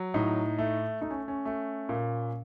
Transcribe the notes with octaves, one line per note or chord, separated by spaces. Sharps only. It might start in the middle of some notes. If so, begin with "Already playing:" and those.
Already playing: F#3
A2 D#4
A3
A3 D#4
C#4
C#4
A3
A#2